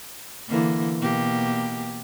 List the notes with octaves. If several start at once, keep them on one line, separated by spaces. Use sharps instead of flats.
D3 E3 A#3
B2 A#3 G4